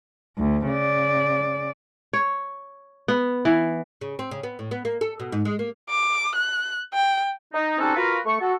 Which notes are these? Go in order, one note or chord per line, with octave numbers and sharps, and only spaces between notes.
D2
C#3 D5
C#5
B3
E3
C#3
C4
C#3
B3
A2
B3
A#3
A4
B2
G#2
G#3
A#3
D6
F#6
G5
D#4
G3 C4 C#4 D#4 F#4 A4
F4 F#4 A#4 B4
A3 C#6
F#4 A4